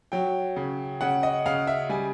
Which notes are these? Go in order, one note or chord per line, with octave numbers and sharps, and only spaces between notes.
F#3 G5
C#3
C#3 F#5
D#5
C#3 F5
E5
G3 G#5